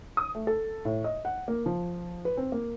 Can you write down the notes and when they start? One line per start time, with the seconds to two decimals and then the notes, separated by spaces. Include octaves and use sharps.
0.17 D#6
0.35 A3
0.47 A4
0.85 A2
1.04 D#5
1.25 F#5
1.48 A#3
1.66 F3
2.25 B4
2.37 C4
2.52 A#3